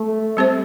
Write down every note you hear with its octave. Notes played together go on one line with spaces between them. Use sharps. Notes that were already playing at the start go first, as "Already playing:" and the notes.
Already playing: A3
G3 C4 G4 C5